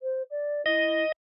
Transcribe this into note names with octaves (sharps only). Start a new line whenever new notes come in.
C5
D5
E4 D#5